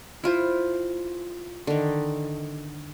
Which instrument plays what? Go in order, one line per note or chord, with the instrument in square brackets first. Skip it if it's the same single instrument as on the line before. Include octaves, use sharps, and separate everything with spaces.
[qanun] E4 F4 C5
D3 D#3